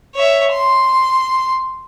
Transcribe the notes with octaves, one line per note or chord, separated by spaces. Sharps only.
C#5 E5
C6